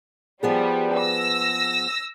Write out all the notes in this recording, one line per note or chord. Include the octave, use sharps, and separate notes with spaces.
F3 G3 B3 G#4
E6 A#6